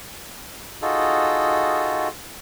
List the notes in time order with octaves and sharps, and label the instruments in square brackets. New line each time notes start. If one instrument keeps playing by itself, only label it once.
[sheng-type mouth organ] D#4 F4 F#4 G#4 A4